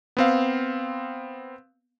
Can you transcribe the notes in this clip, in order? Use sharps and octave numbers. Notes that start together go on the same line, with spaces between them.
B3 C4 F5